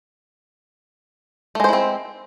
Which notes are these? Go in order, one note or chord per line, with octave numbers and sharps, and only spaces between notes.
G#3 A3 C4 E4 C5